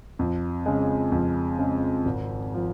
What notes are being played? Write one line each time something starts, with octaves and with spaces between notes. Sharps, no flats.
F2
C#3 G#3
F2
C#3 G#3
G#1
F3